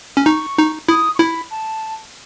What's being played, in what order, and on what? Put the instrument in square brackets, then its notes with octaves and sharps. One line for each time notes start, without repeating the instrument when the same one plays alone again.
[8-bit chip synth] C#4
[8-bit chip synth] D#4 [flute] C#6
[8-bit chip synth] D#4
[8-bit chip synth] E4 [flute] D#6
[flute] C#6
[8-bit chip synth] E4 [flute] B5
[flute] A5